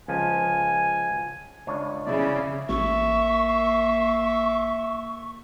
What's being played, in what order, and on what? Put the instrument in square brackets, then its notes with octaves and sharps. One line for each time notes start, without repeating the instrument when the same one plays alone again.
[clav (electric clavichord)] C#2 F3 [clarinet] G#5
[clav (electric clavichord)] C#2 D4 C#5
[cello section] C#3 [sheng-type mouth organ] E4 D5
[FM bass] A1 [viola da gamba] A#3 [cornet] E5 [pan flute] C#6